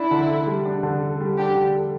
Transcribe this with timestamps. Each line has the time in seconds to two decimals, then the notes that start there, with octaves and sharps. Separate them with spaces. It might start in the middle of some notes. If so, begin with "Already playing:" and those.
Already playing: D4 E4
0.11 D3
0.29 A4
0.47 G3
0.66 D4
0.83 D3
1.01 A4
1.20 G3
1.37 D4 G4
1.56 D3
1.75 A4